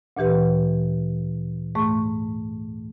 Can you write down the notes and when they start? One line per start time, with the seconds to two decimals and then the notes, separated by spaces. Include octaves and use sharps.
0.17 D2 A#2 E3 G4 B4
1.75 G#2 A3 C#6